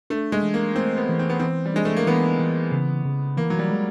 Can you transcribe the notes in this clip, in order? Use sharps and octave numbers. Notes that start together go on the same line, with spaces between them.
A3 D4
G#3
E3
A#3
A3 C4
B3
E3
C4
B3
E3 C4
G3
G#3 D4
A3
A#3
E3 B3
E3
C#3
C#3
E3 A#3
F#3
G3
G#3